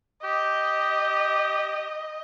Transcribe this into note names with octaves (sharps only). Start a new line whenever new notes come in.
G4 D#5